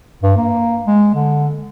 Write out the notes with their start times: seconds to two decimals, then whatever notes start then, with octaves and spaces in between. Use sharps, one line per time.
0.23 G2
0.37 A#3
0.86 G#3
1.15 D3